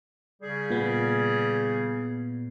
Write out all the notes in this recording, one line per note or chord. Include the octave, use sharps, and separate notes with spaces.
C#3 G3 G#4
A#2 B3